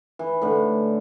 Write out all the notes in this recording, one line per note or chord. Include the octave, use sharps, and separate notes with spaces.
E3
A2 D3